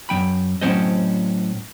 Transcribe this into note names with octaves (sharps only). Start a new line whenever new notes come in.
F#2 G#3 G5 B5
A2 F#3 C4 C#4 C5 D#5